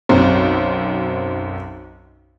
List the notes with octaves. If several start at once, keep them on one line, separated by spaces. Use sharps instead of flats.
B1 F#2 C4